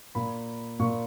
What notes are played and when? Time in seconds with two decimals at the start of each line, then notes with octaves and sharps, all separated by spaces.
0.15 A#2 A#3 B5
0.80 A#2 A#3 C#6